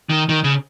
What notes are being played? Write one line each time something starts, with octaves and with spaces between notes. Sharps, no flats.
D#3
D#3
C#3